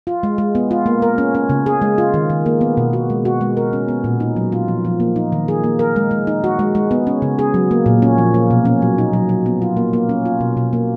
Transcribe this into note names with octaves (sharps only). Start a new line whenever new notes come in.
F4
G#3
G#3
B3
F4
A#3
A#4
C#4
C#4
C#3
G#4
G#3
F4
D#3
D#3
A#3
B3
B2
F#4
G#3
F#4
G#3
A#4
C#4
B3
A#2
D#4
F#3
F4
F3
F3
A#3
D#4
D#3
G#4
A#3
A#4
G#3
G#3
D#4
F#4
G#3
G#3
B3
C#4
C#3
G#4
F#3
A#3
A#2
C#4
F3
A#3
B2
C#4
F#3
D#4
F#3
F#3
B3
F4
A#3
A#3
C#4
F4
B2
B2
A#3